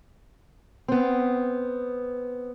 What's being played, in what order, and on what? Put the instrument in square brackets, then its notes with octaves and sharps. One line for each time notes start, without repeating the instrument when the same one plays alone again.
[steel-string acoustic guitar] B3 C4